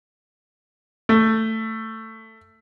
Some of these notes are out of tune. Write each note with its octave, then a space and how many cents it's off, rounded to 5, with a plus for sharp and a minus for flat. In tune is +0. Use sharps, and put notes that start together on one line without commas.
A3 +15